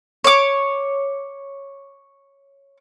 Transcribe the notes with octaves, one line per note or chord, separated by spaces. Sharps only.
C#5 D6